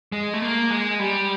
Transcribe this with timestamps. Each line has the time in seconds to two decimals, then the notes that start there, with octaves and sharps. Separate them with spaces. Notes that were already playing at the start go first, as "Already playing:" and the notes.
0.12 G#3
0.33 A3
0.42 A#3
0.70 G#3
0.99 G3